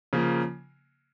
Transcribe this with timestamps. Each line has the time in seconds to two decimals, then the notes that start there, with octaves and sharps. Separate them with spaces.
0.13 C#3 F3 A#3